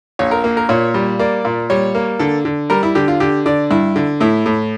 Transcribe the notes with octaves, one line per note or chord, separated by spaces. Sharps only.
A#1 C#5
A#4
A#3
A#4
A#2 C#5
G3
A#3 D5
A#2
G3 C#5
A#3
D3 A4
D3
G3 A#4
E4
D3 G4
F4
D3 G4
D3 D5
G2 E4
D3
A2 E4
A2